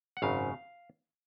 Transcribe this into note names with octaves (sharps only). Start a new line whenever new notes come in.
F#5
G#1 F#2 C#3 F5